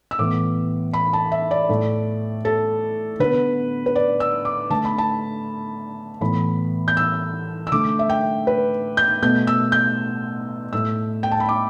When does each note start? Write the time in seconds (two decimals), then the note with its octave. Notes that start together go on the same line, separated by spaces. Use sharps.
0.11 E6
0.19 A2 E3 B3 D6
0.93 B5
1.13 A5
1.32 E5
1.51 D5
1.69 A2 A3
2.45 A4
3.20 D3 B3 B4
3.86 B4
3.95 D5
4.20 E6
4.45 D6
4.70 D3 A3 A5
4.85 B5
4.98 A5
6.21 A2 E3 B3 B5
6.88 G6
6.97 E6
7.67 E6
7.72 D3 A3 D6
7.99 E5
8.09 G5
8.47 B4
8.97 G6
9.22 B2 A3 G6
9.47 E6
9.72 G6
10.73 A2 A3 E6
11.23 G5
11.31 A5
11.40 B5
11.49 D6